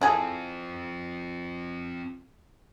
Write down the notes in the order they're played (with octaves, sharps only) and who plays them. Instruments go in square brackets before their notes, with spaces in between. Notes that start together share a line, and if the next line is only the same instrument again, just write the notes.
[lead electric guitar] C4 F4 [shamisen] E4 G#4 A4